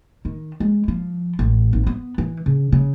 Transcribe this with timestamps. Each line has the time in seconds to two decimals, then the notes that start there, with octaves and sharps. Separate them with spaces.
0.25 D#3
0.60 G#3
0.88 F3
1.39 A1
1.73 G#1
1.87 B3
2.18 E3
2.46 C#3
2.72 C#3